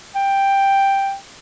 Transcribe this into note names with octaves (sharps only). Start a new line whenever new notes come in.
G5